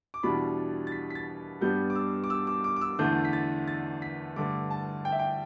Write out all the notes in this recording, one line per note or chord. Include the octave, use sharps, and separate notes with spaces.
D6
E2 B2 G3 D4 B5
A6
B6
B6
A6
G2 G3 B3 D4 G6
D6
E6
D6
E6
D6
D6
D6
E6
E2 D3 A3 D4 G6
B6
A6
A6
B6
G2 D3 A3 D6
A5
G5
E5
G5